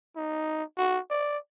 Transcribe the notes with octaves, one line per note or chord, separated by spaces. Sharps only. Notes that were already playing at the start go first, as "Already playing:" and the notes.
D#4
F#4
D5